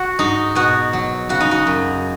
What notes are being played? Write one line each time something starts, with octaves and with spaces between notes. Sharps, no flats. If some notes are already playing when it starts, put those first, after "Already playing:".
Already playing: F#4
G#2 D#4
B2 F#4
F#3
C#3 F#4
D#4
F#4
F#2